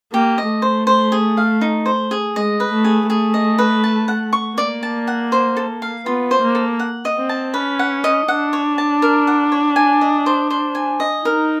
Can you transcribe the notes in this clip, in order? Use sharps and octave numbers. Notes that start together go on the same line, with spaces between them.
A#3 G4
D#5
A3
C5
C5
G#4
F5
D#4
C5
G#4
G#3 D#5
B4
A3
G#4
A3 G#4
D#5
B4
A5
F#5
C#6
A#3 D5
A5
F#5
C5
A4
F5
B3 F4
C5
A#3
A4
F#5
D#5
C4
A5
C#4 B4
F#5
D#5
D4 F#5
C#5
A5
A#4
F#5
C#5
G#5
D#5
C5
C5
G#5
D#5
D#4 A#4